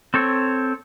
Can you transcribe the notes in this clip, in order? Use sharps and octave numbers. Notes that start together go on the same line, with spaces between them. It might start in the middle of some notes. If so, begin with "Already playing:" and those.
C4 A4 C#5